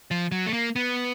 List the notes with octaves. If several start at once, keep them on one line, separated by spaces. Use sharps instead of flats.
F3
F#3
A3
A#3
B3